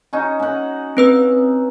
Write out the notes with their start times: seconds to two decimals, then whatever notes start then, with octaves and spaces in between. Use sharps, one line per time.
0.13 C#4 D#4 F#4
0.39 C#4 F#5
0.97 C4 B4 E6